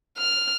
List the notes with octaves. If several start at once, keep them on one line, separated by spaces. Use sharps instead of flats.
F6